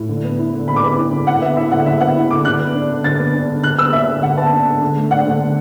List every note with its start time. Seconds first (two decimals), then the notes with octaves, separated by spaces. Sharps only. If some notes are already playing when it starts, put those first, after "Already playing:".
Already playing: A2
0.09 D3
0.24 B3
0.38 E4
0.53 D3
0.68 D3 B5
0.76 D6
0.83 B3 B5
0.97 E4
1.12 D3
1.27 D3 F#5
1.41 B3 E5
1.56 E4 E5
1.72 D3 F#5
1.86 D3 E5
2.00 B3 F#5
2.16 E4
2.30 D3 D6
2.45 D3 F#6
2.60 B3
2.75 D4
2.90 D3
3.04 D3 A6
3.20 B3
3.34 D4
3.49 D3
3.63 D3 F#6
3.78 B3 E6
3.93 D4 E5
4.08 D3
4.17 E5
4.22 D3 F#5
4.37 B3 A5
4.52 D4
4.67 D3
4.81 D3
4.96 A3
5.11 D4 F#5
5.26 D3
5.40 D3